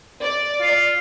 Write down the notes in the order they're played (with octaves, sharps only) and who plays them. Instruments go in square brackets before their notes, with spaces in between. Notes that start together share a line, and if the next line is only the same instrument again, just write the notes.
[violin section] D5
[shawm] F4